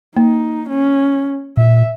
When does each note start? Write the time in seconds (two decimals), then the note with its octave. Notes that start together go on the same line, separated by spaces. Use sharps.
0.17 A#3 D#4
0.69 C#4
1.57 A#2 E5